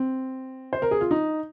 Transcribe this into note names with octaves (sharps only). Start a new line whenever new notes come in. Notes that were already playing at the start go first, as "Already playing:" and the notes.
Already playing: C4
C5
A#4
G#4
F4
D#4